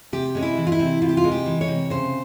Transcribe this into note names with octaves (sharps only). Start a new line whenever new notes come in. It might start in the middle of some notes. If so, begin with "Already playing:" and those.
C3 G4
G#3 C#4
E4
E3
F4
E4
C3
C3 F4
G4
F4
G#3
G4
E3
C#5
C3
C#3 C5